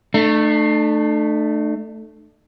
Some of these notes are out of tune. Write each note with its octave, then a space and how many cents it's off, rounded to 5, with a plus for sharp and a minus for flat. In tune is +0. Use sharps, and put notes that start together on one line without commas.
A3 +0 D4 +45